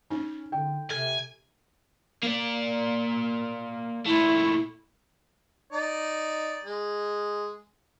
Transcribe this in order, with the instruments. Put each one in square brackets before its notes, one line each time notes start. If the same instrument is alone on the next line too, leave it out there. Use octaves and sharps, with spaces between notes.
[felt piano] C#4 [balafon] D#4
[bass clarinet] D3 [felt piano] G5
[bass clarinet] C3 [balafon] A4 [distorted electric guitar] G#5
[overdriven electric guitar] A#3 D5
[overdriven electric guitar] A#2 A3 [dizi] E4
[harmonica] D#4 D5
G#3